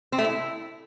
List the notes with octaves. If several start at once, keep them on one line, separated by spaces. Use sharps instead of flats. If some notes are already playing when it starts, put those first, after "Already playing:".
C4
A3
E4